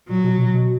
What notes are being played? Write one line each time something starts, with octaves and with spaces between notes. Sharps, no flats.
A#2 F#3
B2
B2
B2